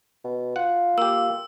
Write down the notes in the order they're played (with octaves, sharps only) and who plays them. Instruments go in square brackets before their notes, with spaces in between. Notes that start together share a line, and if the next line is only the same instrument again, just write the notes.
[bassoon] B2
[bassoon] F4 [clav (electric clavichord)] F#5
[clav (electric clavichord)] A#3 G4 [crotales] E6